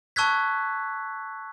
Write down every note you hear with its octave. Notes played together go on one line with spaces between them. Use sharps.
A5 C#6 E6 F#6 G#6 B6